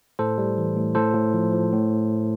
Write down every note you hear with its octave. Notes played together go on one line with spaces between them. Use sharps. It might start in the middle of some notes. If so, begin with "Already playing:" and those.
A2 A4 C5
G3
E3
A2
A2 A4 C5
A2
F3
F3
A2